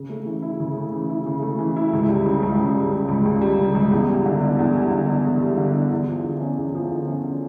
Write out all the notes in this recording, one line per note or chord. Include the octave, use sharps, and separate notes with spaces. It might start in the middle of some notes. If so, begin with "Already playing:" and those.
Already playing: C#3
A3
E3
E4
C#3
A3
E3
E4
C#3
A3
E3
E4
C#2
G3
C#3
C#2
C#2
G3
C#3
C#2
C#2
G3
C#3
C#2
E2
G3
D3
D4
E2
G3
D3
D4
E2
G3
D3
D4
E2
F3
D3
C#4
E2
F3
D3
C#4